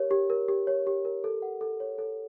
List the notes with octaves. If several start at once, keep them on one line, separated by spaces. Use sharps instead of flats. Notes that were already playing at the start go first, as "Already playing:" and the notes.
Already playing: G4 A#4 C#5
G4
A#4
G4
C#5
G4
A#4
A4
F#5
A4
C#5
A4